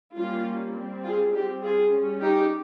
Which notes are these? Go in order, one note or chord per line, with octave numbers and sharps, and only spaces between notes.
G3 A#3 C#4 F4
G3 C4
F4 G#4
G3 C4 D#4 G4
F4 G#4
G3 C#4
D#4 G4